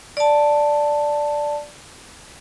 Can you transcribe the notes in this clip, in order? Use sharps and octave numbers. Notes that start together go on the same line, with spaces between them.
D5 A5